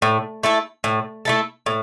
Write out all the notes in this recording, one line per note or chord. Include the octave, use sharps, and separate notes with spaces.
A2
A3 E4 A4
A2
A3 E4 A4
A2